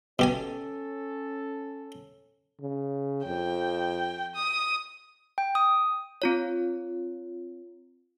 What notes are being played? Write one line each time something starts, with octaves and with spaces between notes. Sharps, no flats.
B2 C#4 G4 A4 G#5
C#3
F2 G5
D#6
G5
D#6
C4 F4 C#5